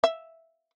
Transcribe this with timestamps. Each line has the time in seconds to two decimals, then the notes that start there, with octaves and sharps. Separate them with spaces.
0.04 E5